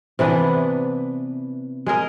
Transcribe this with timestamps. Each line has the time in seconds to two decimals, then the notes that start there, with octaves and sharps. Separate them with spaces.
0.19 C3 E3 B3 D4
1.86 G#3 G#4 A#4 D#5